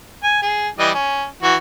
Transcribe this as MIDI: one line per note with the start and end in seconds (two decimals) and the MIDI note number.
0.24 0.42 80
0.42 0.68 68
0.79 0.90 52
0.79 0.90 55
0.79 0.90 75
0.94 1.25 61
1.43 1.56 52
1.43 1.56 66